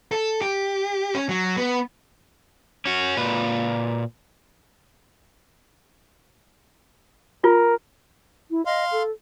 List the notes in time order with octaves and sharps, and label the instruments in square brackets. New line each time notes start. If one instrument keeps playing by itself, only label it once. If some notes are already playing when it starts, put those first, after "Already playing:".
[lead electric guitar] A4
G4
C#4
F#3
B3
[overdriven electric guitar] C#4 F#4
A#2 B4
[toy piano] F4 [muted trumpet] A#4
[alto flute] E4
[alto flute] D#5 [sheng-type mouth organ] F5 C6
[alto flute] A4